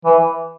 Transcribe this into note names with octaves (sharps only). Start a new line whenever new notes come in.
E3